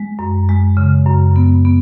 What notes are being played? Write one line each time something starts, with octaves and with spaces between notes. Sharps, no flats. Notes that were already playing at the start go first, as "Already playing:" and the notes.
Already playing: G#3
F#2
G#3
C#3
F#2
B3
B3